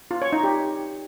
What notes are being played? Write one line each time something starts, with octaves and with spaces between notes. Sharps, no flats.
F4
C#5
D#4
G4